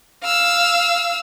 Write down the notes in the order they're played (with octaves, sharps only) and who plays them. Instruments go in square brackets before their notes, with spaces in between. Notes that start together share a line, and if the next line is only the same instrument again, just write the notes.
[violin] F5 E6